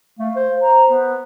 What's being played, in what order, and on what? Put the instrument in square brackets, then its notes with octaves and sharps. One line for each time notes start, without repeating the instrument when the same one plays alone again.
[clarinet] A3 [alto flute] F5
[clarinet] C5
[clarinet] C5 [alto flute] A#5
[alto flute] B3